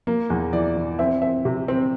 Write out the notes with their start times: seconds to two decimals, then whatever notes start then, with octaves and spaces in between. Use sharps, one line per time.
0.07 A#3
0.30 E2
0.53 E3 D5
0.76 E3
0.99 C4 E5
1.22 C4 E5
1.45 C3
1.68 C4